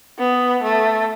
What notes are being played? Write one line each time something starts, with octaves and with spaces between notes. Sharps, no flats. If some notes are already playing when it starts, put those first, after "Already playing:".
B3
A3